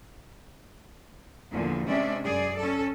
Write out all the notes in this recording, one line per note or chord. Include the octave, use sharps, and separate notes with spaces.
E2 A#2 D3 F3
C3 G#3 C#4 D4 D5 E5
F#2 G#4 D5
C#4 A4